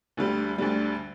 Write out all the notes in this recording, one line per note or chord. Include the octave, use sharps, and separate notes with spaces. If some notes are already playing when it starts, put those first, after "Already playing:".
D2 D3 G3
D2 D3 G3